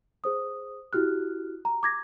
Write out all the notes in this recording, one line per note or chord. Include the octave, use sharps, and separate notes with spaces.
G#4 C5 D#6
E4 F#4 G4 F6 F#6
A#5
D6 G#6 A#6